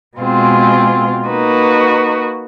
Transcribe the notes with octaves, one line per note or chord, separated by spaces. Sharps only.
B2 G#3 C4 F4 G#4
A#3 D#4 F#4 B4